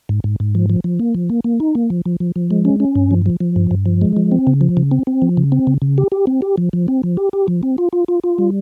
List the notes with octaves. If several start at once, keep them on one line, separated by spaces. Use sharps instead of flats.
G#2
G#2
G#2
F3
F3
F3
A#3
F3
A#3
A#3
D#4
A#3
F3
F3
F3
F3
G#3
C#4
C#4
G2
F3
F3
F3
G2
G2
F3
G#3
F3
C4
C#3
F3
C#3
C4
C4
F3
C#3
C4
C#3
C#3
G4
G4
C4
G4
F3
F3
C4
F3
G4
G4
F3
C4
F4
F4
F4
F4
G3